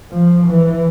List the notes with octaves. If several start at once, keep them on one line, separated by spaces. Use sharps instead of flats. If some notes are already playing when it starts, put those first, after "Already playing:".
F3
E3